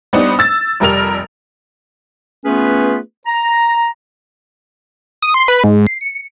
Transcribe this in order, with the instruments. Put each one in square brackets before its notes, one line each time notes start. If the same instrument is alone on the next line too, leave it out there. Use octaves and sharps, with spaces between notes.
[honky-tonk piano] G3 B3 C4 D4 D#4
E6 A6
F1 G3 A#4 F7
[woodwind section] A3 B3 C#4 F4 G#4 B4
A#5
[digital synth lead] D#6
C6
B4
G#2
C7
C#7